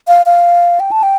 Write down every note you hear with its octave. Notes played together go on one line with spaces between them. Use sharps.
F5
F5
G5
A5
G5